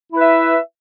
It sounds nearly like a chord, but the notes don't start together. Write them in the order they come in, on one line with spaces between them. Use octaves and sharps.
E4 B4 E5